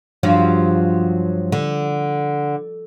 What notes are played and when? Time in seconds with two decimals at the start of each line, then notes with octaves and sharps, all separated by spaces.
0.23 G2 F3 F#3
1.52 D3